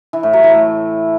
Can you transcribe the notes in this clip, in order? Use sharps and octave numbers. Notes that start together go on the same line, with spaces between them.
E3
A2
F#3
E3
A3